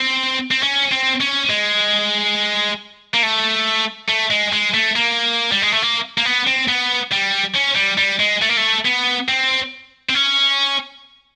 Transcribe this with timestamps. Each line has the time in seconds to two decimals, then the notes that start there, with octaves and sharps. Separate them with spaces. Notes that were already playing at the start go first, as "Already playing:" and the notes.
Already playing: C4
0.51 C4
0.63 C#4
0.92 C4
1.21 C#4
1.50 G#3
3.14 A#3
3.23 A3
4.08 A3
4.30 G#3
4.53 G#3
4.74 A3
4.96 A#3
5.52 G3
5.62 G#3
5.72 A3
5.82 A#3
6.18 A#3
6.25 B3
6.47 C4
6.68 B3
7.12 G3
7.56 C#4
7.76 G3
7.98 G3
8.20 G#3
8.42 A3
8.49 A#3
8.57 A3
8.85 B3
9.29 C4
10.09 C4
10.14 C#4